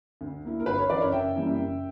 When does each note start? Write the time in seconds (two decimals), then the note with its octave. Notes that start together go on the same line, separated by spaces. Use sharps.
0.21 D2
0.44 D3 A#3 E4
0.60 A#4
0.66 G1 B4
0.78 A#4 C#5
0.90 F#2 E3 B4 D5
1.01 A#4 C#5
1.12 F#1 E5 G5
1.35 F#2 E3 G3 A#3
1.59 F#1